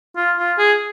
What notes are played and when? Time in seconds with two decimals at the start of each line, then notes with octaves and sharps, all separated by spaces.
0.16 F4
0.38 F4
0.58 G#4